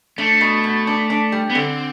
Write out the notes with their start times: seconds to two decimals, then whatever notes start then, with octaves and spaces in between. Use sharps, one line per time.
0.18 A3 D4
0.41 B2
0.64 B2
0.87 D4
1.10 D4
1.32 G3
1.50 B3
1.55 D3 C4